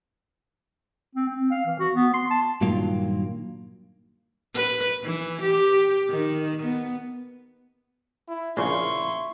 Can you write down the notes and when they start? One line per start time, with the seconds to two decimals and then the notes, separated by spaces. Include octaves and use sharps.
1.15 C4
1.28 C4
1.51 F5
1.65 E3
1.80 F#4
1.94 B3
2.14 C6
2.30 A5
2.61 G2 A#2 D#3 F#3 A#3 F4
4.55 B4
5.04 E3
5.42 G4
6.09 D#3
6.63 B3
8.28 E4
8.57 A#1 A#2 C#3 E4 C6 C#6